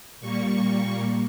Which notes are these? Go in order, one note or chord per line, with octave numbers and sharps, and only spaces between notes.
A#2 G3 A#3 C#6